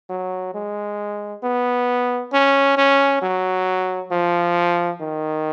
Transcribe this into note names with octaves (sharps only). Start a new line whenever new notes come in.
F#3
G#3
B3
C#4
C#4
F#3
F3
D#3